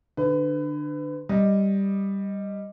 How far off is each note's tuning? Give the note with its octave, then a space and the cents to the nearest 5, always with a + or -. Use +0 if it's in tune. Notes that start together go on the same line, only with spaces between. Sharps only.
D3 +20 B4 +30
G3 +5 D#5 +0